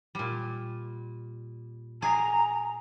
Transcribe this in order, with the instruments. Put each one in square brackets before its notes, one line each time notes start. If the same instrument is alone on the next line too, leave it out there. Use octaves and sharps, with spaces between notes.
[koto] A#2 G3
[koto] G#4 [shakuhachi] A#5